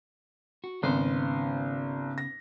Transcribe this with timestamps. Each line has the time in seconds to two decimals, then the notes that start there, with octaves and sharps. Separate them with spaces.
0.64 F#4
0.83 G#1 C#3 B3 C5
2.18 A#6